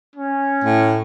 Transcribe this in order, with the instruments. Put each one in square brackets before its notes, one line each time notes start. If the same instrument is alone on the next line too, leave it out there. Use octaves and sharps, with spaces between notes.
[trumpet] C#4
[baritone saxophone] A2